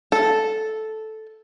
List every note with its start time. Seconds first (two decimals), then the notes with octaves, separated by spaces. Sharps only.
0.12 A4